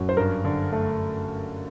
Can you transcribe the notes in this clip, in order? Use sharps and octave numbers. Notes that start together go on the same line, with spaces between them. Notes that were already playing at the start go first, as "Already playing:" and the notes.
Already playing: F#2 F#3
C5
G2 A#4
D3
A3